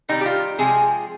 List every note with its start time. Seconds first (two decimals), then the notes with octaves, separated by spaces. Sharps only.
0.09 C3 D#3 G3 D#4
0.21 G4
0.26 F4
0.58 C3 F3 G#3 G#4